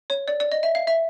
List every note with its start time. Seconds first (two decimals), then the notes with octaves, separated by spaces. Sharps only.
0.10 C#5
0.28 D5
0.40 D5
0.52 D#5
0.63 E5
0.75 F5
0.87 E5